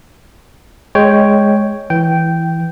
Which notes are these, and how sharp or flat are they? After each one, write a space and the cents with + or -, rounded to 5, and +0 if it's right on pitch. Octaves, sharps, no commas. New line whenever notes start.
G#3 +0 C#5 +0 G5 +0
E3 +0 G5 -10